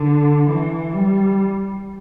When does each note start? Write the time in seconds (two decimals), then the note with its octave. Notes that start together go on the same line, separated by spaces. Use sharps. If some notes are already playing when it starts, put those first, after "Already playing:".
Already playing: D3
0.48 E3
0.93 G3